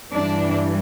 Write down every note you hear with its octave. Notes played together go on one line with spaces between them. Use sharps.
G2 E3 G3 D4